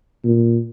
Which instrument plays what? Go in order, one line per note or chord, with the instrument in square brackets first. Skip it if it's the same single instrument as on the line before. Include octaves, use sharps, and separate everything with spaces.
[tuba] A#2